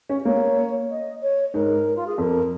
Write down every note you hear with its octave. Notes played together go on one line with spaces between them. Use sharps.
C#4
A#3 C#5
D#5
C#5
G#2 A#4
F4
G#4
F2 A#4